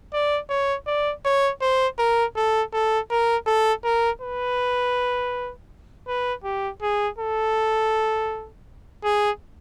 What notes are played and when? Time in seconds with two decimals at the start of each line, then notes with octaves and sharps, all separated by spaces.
0.14 D5
0.50 C#5
0.87 D5
1.25 C#5
1.61 C5
1.99 A#4
2.37 A4
2.73 A4
3.11 A#4
3.47 A4
3.84 A#4
4.22 B4
6.08 B4
6.44 G4
6.82 G#4
7.19 A4
9.04 G#4